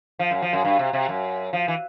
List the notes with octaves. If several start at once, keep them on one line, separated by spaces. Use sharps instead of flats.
F3
F#2
F3
F#2
G2
C3
C3
F#2
F3
E3